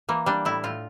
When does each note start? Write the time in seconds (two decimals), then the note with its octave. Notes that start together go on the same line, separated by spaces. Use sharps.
0.09 E3 A#3
0.26 G3 D4
0.45 A2 E4
0.64 A2 F4